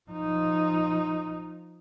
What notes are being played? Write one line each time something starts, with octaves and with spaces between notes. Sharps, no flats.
F3 D#4